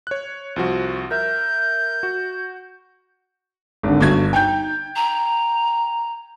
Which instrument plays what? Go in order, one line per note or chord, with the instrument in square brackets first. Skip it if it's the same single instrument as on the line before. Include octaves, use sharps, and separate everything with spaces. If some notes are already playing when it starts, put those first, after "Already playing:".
[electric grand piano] C#5 F#6
C2 F3 F#4
[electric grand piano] A#4 E5 [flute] G6
[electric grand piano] F#4
[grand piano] G#1 D3
[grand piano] G1 G#6 [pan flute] F#4
[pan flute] D#4 [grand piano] G5 G6
[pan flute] A#5